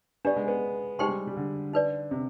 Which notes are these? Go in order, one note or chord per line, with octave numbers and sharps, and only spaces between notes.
B3 D4 G4 D5
G#3
B3
G#3 D#4 G4 C5 G5 C6
G3
G3
D3
D#4 B4 D5
C3